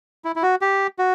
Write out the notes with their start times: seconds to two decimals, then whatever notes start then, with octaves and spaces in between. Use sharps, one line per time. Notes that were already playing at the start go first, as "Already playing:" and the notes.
0.25 E4
0.36 E4
0.43 F#4
0.61 G4
0.99 F#4